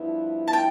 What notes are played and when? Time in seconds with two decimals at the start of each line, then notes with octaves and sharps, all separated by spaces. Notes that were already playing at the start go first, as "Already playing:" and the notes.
Already playing: G2 F3 B3 E4
0.48 A5
0.53 G5